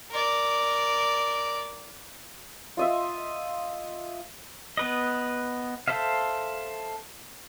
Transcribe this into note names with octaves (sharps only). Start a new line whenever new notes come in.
A#4 D5
F4 D#5 E5
B3 B4 D#5
A4 C5 E5 F5